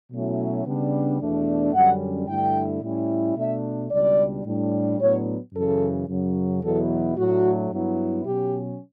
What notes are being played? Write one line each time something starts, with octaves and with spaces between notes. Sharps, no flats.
B2 F#3 A3 C#4 E4
C#3 G3 B3 D4
E2 B2 A3 D4
F#2 D3 G3 C#4 F#5
G2 D3 A3 E4 G5
A2 G3 C#4 E4
B2 A3 D4 E5
C#2 B2 G3 D4 D5
A2 G3 D4
A2 F#3 B3 D4 C#5
F#2 C#3 E3 A4
F#2 C#3 F#3
E2 B2 F#3 B3 E4 A4
A2 F#3 A3 D4 F#4
G2 F#3 B3 E4
B2 F#3 C#4 G4